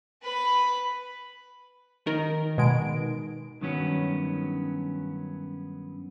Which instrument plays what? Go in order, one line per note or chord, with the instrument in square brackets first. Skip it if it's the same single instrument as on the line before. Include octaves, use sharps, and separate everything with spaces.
[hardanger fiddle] B4 B5
[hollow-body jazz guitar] D#3 [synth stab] A#4
[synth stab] B2 G#3 D7
[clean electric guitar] G2 D#3 F#3 B3 C#4